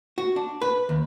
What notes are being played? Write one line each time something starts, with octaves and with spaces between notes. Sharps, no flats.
F#4
D4
B4
D#2